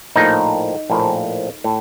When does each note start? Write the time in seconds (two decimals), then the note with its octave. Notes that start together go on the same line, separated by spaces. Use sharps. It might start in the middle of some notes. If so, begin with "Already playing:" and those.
0.15 A#1 A2 F3 A#3 D#4
0.90 A#1 A2 F3 A#3
1.64 A2